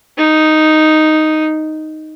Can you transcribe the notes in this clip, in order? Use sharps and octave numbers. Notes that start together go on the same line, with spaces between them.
D#4